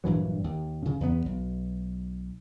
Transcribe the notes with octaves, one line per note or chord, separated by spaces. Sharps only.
A#1 G2 E3 F#3
D#2
C#3
E2 B3
B1